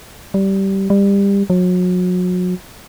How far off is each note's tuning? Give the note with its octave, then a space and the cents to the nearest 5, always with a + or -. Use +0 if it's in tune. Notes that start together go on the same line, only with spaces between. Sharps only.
G3 -15
G3 +25
F#3 -35